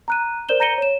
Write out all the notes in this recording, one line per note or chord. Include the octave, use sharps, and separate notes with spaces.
A#5 F#6 D#7
A#4 C5 D5 G6 E7 G7
A#5 G6 A#6 C#7 D#7 G7
C#5 E7